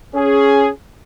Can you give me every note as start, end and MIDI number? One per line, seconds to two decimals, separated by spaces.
0.15 0.69 61
0.15 0.69 68